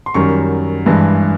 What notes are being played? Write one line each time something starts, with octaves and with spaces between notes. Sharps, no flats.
C6
F#2 D#3 G3 C#6
G2 E3 G#3